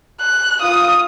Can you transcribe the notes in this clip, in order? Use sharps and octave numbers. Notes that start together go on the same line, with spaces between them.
F#6
F4 D#6